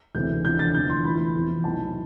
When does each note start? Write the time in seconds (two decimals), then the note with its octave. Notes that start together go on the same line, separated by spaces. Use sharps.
0.15 E1 D2 C3 E3 G6
0.45 E2 D3 F3 G6
0.59 A6
0.74 F1 E2 D3 F3 G6
0.90 C6
1.04 A1 A2 E3 B5
1.35 F1 E2 C3 F3
1.64 B1 A2 E3 A5